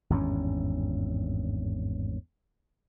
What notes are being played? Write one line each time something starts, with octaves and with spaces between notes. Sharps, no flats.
G#1 E2 G2 C#4